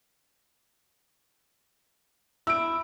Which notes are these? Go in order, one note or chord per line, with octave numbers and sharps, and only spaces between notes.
E4 E6 D7